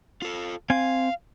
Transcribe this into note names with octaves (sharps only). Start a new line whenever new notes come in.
F4 A4
C4 F5 G#5